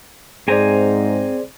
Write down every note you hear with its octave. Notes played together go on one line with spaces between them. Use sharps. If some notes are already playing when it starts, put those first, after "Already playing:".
G#2 C4 G#4 C5 D5 G#5 A#5